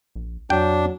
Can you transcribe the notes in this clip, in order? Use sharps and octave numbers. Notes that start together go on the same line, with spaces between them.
A#1
F2 F#3 D4 G5